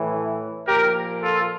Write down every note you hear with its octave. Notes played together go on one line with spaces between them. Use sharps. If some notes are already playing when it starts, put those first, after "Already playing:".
Already playing: A2 E3
A#2 F3 G4 A#4
F4 A4